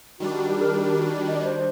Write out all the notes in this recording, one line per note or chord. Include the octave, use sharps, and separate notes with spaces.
D#3 G3 D4 F#4
G4
A#4
G4
F#4
D#5
D5
C5